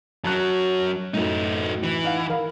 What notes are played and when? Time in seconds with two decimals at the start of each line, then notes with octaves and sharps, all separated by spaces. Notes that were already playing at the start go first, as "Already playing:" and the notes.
0.24 F#2 F#3 A5 F#6
1.14 F#2 A2 A3 D#4
1.83 E3
2.04 D#4 F5 F#5
2.29 A#4 F5 B5